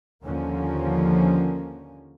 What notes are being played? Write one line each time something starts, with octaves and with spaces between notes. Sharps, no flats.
D#2 D3 F3 A#3 C#4